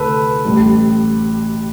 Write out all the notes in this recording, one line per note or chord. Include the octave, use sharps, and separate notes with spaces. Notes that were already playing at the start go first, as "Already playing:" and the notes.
Already playing: D2 C3 A4 B4
A1 A2 G3